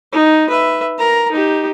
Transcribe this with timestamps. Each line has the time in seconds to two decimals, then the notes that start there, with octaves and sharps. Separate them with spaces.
0.12 D#4
0.50 B4 E5
0.98 A#4 A#5
1.32 D#4 G4